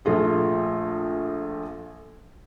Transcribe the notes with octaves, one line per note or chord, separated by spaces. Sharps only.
A#1 A3 F4 G#4